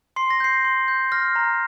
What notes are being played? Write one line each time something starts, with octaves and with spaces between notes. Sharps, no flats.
C6 C7
A#6
G6 C7
C6
G6
F6 A#6
A#5